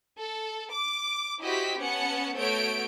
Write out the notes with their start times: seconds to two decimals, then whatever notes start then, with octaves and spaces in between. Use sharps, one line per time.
0.18 A4
0.72 D6
1.42 E4 F#4 G4 C5 D#5 B6
1.79 B3 C#4 F#5 A5 C#7
2.38 A3 B3 F#4 C#5 G6 D7